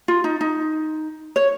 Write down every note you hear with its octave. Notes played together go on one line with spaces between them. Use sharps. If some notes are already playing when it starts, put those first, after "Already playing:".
F4
D#4
D#4
C#5